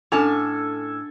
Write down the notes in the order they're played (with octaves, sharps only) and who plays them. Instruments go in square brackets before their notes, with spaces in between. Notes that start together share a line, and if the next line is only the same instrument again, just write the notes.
[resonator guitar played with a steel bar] A2 C#4 A5 [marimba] D4 [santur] A4 G#5